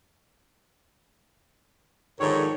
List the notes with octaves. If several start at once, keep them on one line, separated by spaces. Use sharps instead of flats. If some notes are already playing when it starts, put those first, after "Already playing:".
G#2 D3 D#3 F3 A4 A#4 C#5